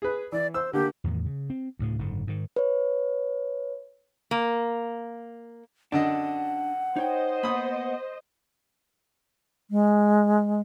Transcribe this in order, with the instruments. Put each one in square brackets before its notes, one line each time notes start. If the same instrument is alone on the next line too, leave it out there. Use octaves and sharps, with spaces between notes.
[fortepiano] G#4 B4
[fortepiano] E3 [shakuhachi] D5
[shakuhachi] C5 [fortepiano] E6
[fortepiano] D3 A#3 [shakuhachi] G4
[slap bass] E2 A2 D#3
C#3
C4
D2 A2 C#3
F#1 G#2 D3
G#2 D#3
[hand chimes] B4 C#5
[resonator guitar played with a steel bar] A#3
[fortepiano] F#2 D3 D#5 [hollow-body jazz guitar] D4 [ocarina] F#5
[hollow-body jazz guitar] D#4 C#5 G5 [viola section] C5 D#5
[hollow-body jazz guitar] A#3 B3 [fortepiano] B5 D#6
[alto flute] G#3